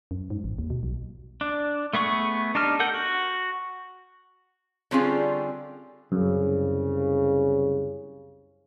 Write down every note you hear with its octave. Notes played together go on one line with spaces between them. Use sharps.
F#2
G#2
A1
D#2
B2
B1
D4
A3 B3 G#4 C#6
D4 D#4 G4 A5 F6
A4 A#4 F#5 G6
F#4
D3 G3 C4 C#4 F4 G#4
C2 F#2 C#3